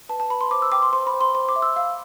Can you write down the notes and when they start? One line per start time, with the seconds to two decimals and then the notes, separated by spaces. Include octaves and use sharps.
0.09 B4 A5
0.20 A5
0.30 B4 B5
0.41 C6
0.51 C5 D6
0.62 E6
0.72 G5 D6
0.82 C6
0.93 C5 C6
1.07 B5
1.14 C5
1.21 C6
1.34 C5 C6
1.49 D6
1.56 E5
1.62 E6
1.76 F5 E6